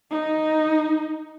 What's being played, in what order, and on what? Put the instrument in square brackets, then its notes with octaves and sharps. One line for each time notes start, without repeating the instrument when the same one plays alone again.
[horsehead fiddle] D#4